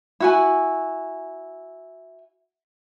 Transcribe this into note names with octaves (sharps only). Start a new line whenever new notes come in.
E4 F#4 G#5